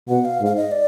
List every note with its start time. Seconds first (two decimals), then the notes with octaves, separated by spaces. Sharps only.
0.09 B2 F#5
0.25 F5
0.41 G#2
0.46 F5
0.56 D#5
0.71 D5